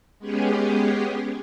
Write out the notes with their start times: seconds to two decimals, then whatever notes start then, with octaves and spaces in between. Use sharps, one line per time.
0.19 G#3 B3 C#4 G4 G#4